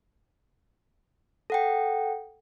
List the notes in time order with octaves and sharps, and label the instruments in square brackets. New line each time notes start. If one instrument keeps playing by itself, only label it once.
[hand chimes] A4 F#5 G5